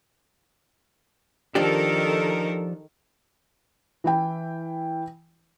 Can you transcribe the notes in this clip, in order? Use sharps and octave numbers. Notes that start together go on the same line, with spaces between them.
D#3 F3 D4 G4 A4 A#4
E3 E4 G5